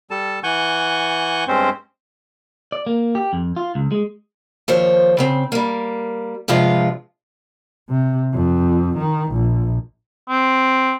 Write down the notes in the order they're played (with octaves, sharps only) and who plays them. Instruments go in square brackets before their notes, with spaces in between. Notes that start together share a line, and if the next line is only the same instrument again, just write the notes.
[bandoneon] G3 A4 A5
E3 F#5 G#5 C#6 G6
G2 G#3 C4 C#4 C5
[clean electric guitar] D5
A#3
G4
F2
F4
C#2
G#3
[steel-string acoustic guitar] D#2 F3 C5 C#5
C#3 C4
G3 A#3
G2 C3 F3 G#3 F4
[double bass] C3
F2
D#3
A#1
[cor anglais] C4